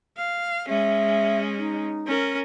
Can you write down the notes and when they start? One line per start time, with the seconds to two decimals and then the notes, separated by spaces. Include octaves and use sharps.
0.17 F5
0.69 G#3 C#4 E5
1.58 D#4
2.07 C#4 A#4